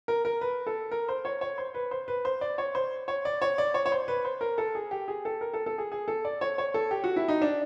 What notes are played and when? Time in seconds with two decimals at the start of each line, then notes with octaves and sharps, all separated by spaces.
0.08 A#4
0.25 A#4
0.41 B4
0.67 A4
0.91 A#4
1.09 C5
1.25 C#5
1.41 C#5
1.58 C5
1.74 B4
1.91 C5
2.08 B4
2.25 C5
2.41 D5
2.58 C#5
2.75 C5
3.08 C#5
3.25 D5
3.42 C#5
3.58 D5
3.74 C#5
3.86 C#5
3.92 C5
4.08 B4
4.25 C5
4.41 A#4
4.58 A4
4.75 G#4
4.91 G4
5.08 G#4
5.25 A4
5.41 A#4
5.54 A4
5.66 A4
5.78 G#4
5.92 G#4
6.08 A4
6.25 D5
6.41 C#5
6.58 C#5
6.74 A4
6.91 G4
7.04 F#4
7.16 E4
7.28 D#4
7.42 D4